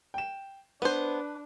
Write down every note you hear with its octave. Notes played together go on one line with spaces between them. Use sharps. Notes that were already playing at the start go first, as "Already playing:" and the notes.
G5 E7
B3 D4 B4 C5